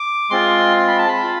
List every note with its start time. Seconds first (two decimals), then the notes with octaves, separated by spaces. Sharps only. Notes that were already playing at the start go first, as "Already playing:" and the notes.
Already playing: D6
0.30 G#3 C4 F4 C6
0.77 C6
0.87 B5
0.98 A5
1.08 B5
1.23 F4